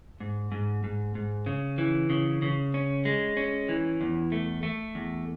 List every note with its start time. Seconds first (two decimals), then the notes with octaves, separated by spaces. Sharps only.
0.20 G#2
0.52 G#2
0.84 G#2
1.15 G#2
1.46 C#3
1.78 E3
2.10 C#3
2.42 C#3
2.74 C#4
3.05 G#3
3.37 C#4
3.69 E3
4.01 E2
4.32 A3
4.63 A3
4.95 E2